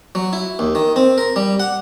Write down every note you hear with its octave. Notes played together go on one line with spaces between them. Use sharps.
F#3
E4
D#2
D#3
C4
A#4
G3
F#5